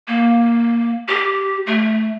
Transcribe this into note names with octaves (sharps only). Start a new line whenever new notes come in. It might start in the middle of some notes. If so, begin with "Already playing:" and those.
A#3
G4
A3